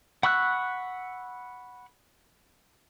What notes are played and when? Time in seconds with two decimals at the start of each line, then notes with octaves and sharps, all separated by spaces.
0.23 F#5 B5 C#6 E6 F#6